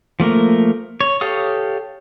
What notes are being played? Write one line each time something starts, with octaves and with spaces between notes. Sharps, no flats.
F3 A3 A#3 A#4
C#5
G4 A4 C#5 F5 D#6